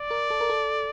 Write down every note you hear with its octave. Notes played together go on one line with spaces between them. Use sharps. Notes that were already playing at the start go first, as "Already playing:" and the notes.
Already playing: D5
A#4
A4
A#4
A4